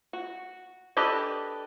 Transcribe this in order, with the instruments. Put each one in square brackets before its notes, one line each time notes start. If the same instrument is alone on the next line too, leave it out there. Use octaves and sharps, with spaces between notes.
[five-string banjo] F#4
D4 G4 A4 B4 D#5